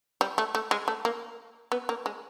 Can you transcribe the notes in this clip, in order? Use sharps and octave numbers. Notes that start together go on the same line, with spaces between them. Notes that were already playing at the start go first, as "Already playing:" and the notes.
G3
A3
A3
G#3
A3
A#3
B3
A#3
G#3